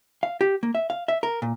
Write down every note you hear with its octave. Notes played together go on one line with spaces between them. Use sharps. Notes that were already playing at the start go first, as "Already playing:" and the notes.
F5
G4
A#3
E5
F5
E5
A#4
A#2